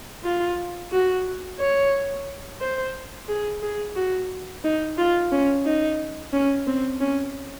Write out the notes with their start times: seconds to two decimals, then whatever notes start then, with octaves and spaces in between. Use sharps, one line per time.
0.24 F4
0.92 F#4
1.59 C#5
2.61 C5
3.28 G#4
3.62 G#4
3.96 F#4
4.64 D#4
4.98 F4
5.31 C#4
5.65 D#4
6.33 C#4
6.67 C4
7.00 C#4